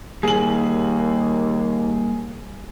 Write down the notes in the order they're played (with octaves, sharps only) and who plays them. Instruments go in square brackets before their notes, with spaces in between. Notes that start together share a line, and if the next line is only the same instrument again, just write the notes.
[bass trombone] D#2 [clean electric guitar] G3 A#3 [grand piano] G#4 F#7